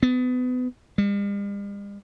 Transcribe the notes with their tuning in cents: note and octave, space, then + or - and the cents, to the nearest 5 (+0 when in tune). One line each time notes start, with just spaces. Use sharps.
B3 +30
G3 +45